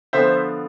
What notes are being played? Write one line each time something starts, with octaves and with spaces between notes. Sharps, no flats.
D3 F3 B3 C5 E5